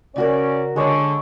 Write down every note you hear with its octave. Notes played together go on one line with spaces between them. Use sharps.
C#3 C#4 F#4 A#4 D5
D3 G#3 C#5 D5